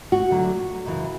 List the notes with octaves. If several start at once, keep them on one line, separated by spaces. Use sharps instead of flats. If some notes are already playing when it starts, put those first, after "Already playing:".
F#4
D2 D3 F#3 A3
F#2 C#3 E3